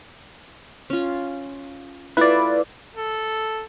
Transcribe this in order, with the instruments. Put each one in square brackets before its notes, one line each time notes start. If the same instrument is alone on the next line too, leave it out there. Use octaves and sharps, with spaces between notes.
[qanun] C#4 F4
[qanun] A3 E4 F4 [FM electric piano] B4 D5
[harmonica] A4